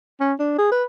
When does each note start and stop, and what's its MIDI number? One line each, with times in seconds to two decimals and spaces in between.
0.20 0.33 61
0.40 0.56 62
0.58 0.67 68
0.72 0.84 71